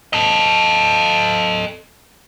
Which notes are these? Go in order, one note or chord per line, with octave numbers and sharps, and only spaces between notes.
A4 D#5